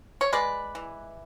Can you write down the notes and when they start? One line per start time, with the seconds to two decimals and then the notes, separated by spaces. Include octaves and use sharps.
0.21 C#5
0.33 G#3 B4 D5
0.75 E3